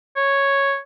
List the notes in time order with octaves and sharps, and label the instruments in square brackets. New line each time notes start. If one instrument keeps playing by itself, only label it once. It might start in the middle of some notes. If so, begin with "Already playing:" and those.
[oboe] C#5